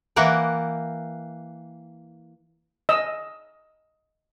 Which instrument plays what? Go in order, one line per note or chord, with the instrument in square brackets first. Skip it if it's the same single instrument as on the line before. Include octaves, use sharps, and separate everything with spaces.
[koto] E3 A#3 F#5 G5
[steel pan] D#5 E6